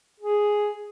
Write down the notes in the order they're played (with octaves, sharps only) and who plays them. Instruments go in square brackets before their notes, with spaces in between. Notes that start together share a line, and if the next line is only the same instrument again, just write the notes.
[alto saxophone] G#4